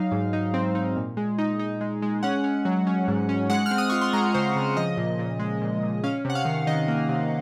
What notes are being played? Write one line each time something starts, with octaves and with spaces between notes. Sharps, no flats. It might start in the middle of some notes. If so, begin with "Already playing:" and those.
Already playing: F#3 D#4 F5
G#2
D#4
C4
D#4
A#2
G#3
D#4
D#4
G#3
G#3
C#4 F#5
C#4
F#3
C#4
G#2
C#4
G#3 F#5
F6
C4
D#6
F4 C#6
C6
G#3 A#5
C#3 C5
C#3
F3 D#5
A#2
A#2
G#3
A#2
A#2
C#4 F5
C3 F#5
F5
D#3
D#3 D#5
A#3
C3